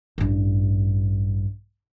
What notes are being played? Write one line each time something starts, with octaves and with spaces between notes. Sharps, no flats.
A1 G2